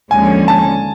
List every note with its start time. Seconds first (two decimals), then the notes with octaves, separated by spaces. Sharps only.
0.11 D#2 D3 F3 G#3 C#4 G#5
0.48 A5